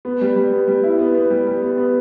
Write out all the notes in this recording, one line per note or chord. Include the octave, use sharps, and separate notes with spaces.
B3
G3
G3
B3
G3
E4
B3
B3
G3
G3
B3
B3